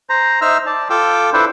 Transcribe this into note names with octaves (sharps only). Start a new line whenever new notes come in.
C5 A#5
D#4 C5 E5 E6 F6
D5 A5
F4 A4 G5 D6 E6
D4 E4 A4 B4 C5 E5